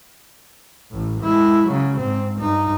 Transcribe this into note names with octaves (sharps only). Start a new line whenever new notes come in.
A1 A2
G#3 E4
C#3 F#3
G#2 C4
G2 D#4